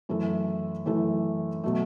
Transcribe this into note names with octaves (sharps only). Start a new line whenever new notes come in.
F#2 E3 A3 E4 A4
F#2 E3 A3 E4 A4
B2 F#3 A3